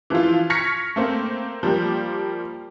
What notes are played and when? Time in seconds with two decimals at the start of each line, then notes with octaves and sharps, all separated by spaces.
0.10 E3 F3 E4 F4
0.50 C#6 F6 G#6 A#6 B6 C#7
0.96 A3 A#3 C4
1.63 F3 G3 A#3 G4